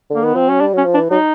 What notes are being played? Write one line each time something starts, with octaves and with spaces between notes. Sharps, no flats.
D3
A#3
D#3 B3
F3 C4
F#3 C#4
G3 D4
F#3 C#4
F3
D4
E3
F#3 D#4